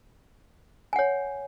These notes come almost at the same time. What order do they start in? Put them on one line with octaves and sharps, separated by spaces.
G#5 F#5 C#5